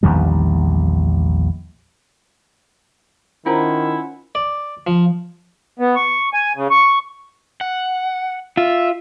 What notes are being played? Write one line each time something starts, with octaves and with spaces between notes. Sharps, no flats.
A#1 E2 D#3 G3
D#3 C#4 E4 F4 A#4 C5 F#5 A#5
D5
F3
B3
C#6
G#5
C#3
C#6
F#5
F4 E5